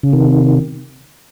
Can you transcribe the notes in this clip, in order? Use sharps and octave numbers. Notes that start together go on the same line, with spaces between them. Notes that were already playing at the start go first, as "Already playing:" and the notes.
C#3
C3 D#3